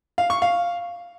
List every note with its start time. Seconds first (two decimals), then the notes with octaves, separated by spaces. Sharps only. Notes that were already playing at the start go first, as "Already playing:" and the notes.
0.18 F5
0.30 C#6
0.42 F5